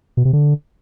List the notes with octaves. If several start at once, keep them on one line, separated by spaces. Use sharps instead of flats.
B2
C3
D3